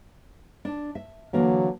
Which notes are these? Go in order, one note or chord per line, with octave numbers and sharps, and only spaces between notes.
D4
E5
D3 E3 F#3 A#3